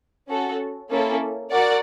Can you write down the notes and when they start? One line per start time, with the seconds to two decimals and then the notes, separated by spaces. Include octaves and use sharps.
0.29 C#4 F#4 A4
0.91 A#3 C#4 E4 A4
1.51 F#4 A#4 D5 F#5